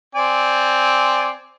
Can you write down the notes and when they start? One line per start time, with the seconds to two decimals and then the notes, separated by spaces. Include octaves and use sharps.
0.15 C4 D5 G#5